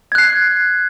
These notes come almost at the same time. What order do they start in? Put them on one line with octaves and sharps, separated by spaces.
G#6 F#6 C7